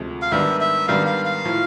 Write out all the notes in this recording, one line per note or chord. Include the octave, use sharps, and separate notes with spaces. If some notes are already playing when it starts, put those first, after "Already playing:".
Already playing: D2 C3 F3 G#3
F5
G#2 D#3 G3 B3 D4 E5
E5
G#2 D#3 G3 B3 D4 F5
F5
F5
A2 F3